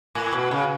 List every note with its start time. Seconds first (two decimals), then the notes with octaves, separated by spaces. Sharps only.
0.15 A2
0.33 B2
0.51 C#3